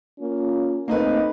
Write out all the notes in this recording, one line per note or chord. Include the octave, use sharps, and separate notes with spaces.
A#3 C#4 F4
A3 A#3 C4 D#4 B4 D#5